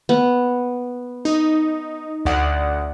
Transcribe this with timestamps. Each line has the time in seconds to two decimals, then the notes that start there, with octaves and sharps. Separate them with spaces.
0.09 B3
1.25 D#4
2.25 D2 D5 F#5